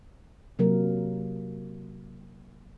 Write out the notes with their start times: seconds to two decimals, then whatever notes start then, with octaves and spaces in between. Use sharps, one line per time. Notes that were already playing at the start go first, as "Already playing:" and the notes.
0.59 C3 F#3 A#3 A#4